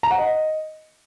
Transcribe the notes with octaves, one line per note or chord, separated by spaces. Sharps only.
A#5
F#5
D#5